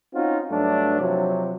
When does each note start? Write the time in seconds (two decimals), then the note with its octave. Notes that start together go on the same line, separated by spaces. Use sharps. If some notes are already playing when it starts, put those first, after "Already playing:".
0.14 C4 C#4 D#4 F4 F#4
0.51 G2 F#3 A3 D4
1.01 C3 F3 F#3